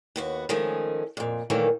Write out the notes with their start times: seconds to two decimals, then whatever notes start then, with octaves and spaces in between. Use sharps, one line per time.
0.16 D#2 B3 F#4
0.49 D#3 F3 G#3 A3 C#4
1.17 F2 A#2
1.50 A#2 D#3 E3 F#3 A3 A#3